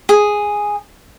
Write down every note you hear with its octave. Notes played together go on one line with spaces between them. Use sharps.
G#4